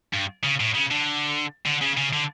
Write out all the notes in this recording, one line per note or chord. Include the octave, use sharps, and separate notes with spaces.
G2
C#3
A2
C#3
D3
D3
C#3
C#3
D3